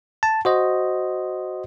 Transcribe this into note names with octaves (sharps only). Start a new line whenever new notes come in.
A5
F#4 C5 D#5